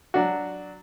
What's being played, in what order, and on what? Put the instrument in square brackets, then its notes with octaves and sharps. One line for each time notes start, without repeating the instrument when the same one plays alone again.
[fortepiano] F#3 D4 F#4